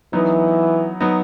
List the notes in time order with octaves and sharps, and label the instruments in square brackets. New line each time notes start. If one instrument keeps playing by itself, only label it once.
[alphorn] E3 [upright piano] F#3 B3 D#4
[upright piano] F#3 B3 D#4